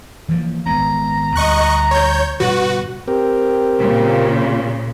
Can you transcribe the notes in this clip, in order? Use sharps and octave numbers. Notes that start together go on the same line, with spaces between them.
E3 F3 A#3
G#1 G#3 B3 A#5
D2 G3 D#5 C#6 F#6
C#5 G6
G2 B2 D3 F#4 B4
C4 G4 A#4
A#2 C#3